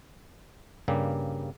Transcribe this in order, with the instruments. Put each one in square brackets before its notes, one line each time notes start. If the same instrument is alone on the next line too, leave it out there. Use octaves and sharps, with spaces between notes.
[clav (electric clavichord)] G2 C#3 G3 A#3